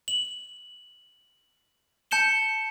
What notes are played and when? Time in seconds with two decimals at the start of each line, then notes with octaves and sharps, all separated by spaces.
0.08 F#7
2.11 A5 G6 C#7 E7 G7